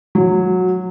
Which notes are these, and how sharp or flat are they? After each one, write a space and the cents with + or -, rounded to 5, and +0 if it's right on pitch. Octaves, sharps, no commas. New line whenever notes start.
F#3 -15